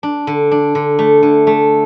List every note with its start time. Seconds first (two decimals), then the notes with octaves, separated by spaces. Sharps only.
0.03 D4
0.27 D3
0.51 D4
0.75 D3
0.99 A3
1.23 D3
1.47 A3